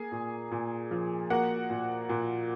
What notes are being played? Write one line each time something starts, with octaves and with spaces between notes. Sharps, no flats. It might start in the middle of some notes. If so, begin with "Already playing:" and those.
Already playing: A#3 G#4 G#5
A#2
A#2
F3
A#3 F#4 F#5
A#2
A#2